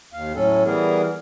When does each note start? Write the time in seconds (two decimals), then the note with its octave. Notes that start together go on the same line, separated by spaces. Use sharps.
0.13 D#2 F5
0.36 A2 F#3 C#4 A4
0.65 E3 G3 B3 G#4 A#4